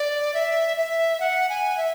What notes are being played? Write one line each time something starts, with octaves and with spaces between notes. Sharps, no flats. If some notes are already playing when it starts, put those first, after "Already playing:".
Already playing: D5
E5
E5
F#5
G#5
E5